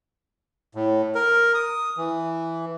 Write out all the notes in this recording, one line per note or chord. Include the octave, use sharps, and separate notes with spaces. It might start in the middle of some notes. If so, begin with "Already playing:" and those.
A2
A#4
D#6
E3